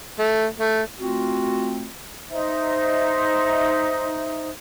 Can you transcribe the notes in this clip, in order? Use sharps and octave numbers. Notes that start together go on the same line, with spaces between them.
A3
A3
A3 C4 F4 F#4
D#4 C5 E5